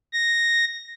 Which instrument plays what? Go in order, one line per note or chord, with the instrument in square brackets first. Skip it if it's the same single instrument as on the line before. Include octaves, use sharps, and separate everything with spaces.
[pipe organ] A#6